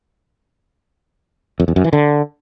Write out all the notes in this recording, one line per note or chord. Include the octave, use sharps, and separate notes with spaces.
F2
E2
F#2
E3
D3